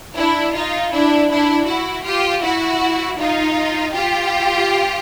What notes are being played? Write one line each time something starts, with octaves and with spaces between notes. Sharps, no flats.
D4 E4
D#4 F4
D4 E4
D4 E4
E4 F#4
F4 G4
E4 F#4
D#4 F4
F4 G4